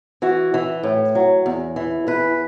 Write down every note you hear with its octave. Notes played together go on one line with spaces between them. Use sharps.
E3 F#4
E3
A2
F#3
E2
E3
E2 B4